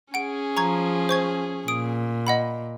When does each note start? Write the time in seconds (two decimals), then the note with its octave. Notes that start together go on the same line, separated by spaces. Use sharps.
0.14 C#4 G#4 F#5 D7
0.57 F3 A#5 C#6 G#6
1.09 C5 C#6 G#6
1.68 A#2 D#6 D7
2.27 D#5 F#5 B5